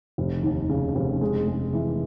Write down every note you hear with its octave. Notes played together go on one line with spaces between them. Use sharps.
F1
D#2
C#3
F1
G#3
G#3
E3